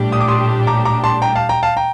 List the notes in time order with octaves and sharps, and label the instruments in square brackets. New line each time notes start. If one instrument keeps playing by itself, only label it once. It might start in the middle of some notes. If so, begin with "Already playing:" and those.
Already playing: [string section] A#1 A2 G3 D4 G4
[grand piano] D#6
D6
C6 D#6
A#5 D6
A#5 D6
A5 C6
G5 A#5
F5 A5
G5 A#5
F5 A5
G5 A#5